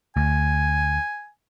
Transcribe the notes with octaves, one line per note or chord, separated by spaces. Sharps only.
D2 G#5